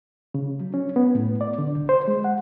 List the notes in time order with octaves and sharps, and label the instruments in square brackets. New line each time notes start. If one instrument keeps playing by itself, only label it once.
[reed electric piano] C#3
F#3
C#4
B3
A2
D5
D3
C2
C5
G#3
F#5